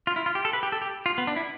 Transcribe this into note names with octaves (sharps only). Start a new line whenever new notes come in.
F4
E4
F4
G4
A4
B4
G4
A4
G4
F4
B3
D4
E4